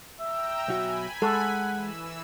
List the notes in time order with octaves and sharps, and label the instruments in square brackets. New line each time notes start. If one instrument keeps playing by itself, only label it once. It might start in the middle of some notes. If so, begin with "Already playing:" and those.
[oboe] E5 [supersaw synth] G5 A#5 E6
[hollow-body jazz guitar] B1 F#4 [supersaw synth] G#5 B5
[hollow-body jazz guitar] G#3 [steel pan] A4 [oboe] F#5
[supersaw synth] E3 E6